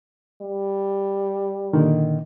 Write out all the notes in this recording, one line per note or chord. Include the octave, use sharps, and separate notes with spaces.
G3
A#2 D3 D#3